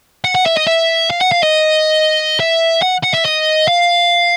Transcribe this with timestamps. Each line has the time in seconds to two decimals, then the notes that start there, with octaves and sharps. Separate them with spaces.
0.25 F#5
0.35 F#5
0.46 E5
0.57 D#5
0.67 E5
1.10 F5
1.21 F#5
1.32 F5
1.43 D#5
2.40 E5
2.82 F#5
3.04 F#5
3.14 E5
3.26 D#5
3.68 F5